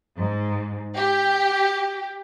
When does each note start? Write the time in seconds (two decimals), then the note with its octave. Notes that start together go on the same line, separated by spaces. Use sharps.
0.17 G#2
0.95 G4